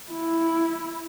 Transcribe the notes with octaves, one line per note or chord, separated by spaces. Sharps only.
E4